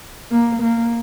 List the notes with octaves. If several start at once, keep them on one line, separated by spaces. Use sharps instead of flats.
A#3
A#3